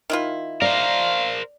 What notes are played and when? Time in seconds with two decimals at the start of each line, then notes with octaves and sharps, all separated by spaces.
0.10 D#3 E4 F4
0.62 A#4 C5 D5 F5